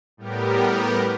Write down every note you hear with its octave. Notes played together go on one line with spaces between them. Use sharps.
A2 G3 B3 G4 A#4